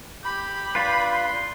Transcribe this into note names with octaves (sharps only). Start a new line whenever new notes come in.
G4 B5
D4 F4 B4
C6